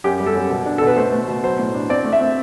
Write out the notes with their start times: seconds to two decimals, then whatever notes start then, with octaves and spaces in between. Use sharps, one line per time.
0.04 F#2 G4
0.20 G3
0.26 A4
0.35 F#2
0.50 B2
0.66 D4
0.78 B2 A4
0.87 B4
0.97 A3 C5
1.12 A3
1.28 B2
1.43 F#3 C5
1.59 A2
1.74 D4
1.89 C4 D5
2.04 A3
2.13 E5
2.20 C4